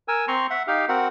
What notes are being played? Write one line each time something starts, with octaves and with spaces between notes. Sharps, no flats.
A#4 G#5 E6
C4 A#5 C6 C#6
E5 F#5
D#4 G4 F5
C4 F#4 A#4 F#5